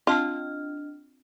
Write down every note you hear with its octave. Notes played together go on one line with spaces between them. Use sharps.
C4 D4 F4 D#5 A5 C6 F6